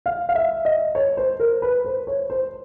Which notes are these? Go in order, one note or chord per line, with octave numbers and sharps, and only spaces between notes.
F5
F5
E5
D#5
C#5
C5
A#4
B4
C5
C#5
C5